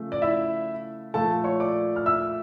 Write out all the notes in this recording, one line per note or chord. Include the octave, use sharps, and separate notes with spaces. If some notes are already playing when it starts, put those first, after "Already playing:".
Already playing: C#3 F3 A3
D5
E4 E5
A#2 F3 A3 A4 A5
C#5 C#6
D5 D6
F6
E5 E6